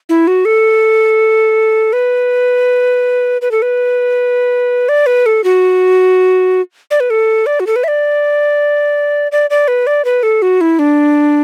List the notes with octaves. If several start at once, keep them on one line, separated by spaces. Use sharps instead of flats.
E4
F#4
A4
B4
B4
A4
B4
D5
B4
A4
F#4
D5
B4
A4
D5
F#4
A4
B4
E5
D5
D5
D5
B4
D5
B4
A4
F#4
E4
D4